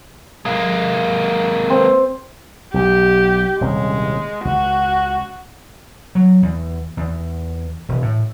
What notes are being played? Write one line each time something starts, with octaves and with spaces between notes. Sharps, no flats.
G#3 A#3
C4
B1 G4
D#1 C2 G#3 C#4
C#2 F#4
F#3
E2
E2
E1
A2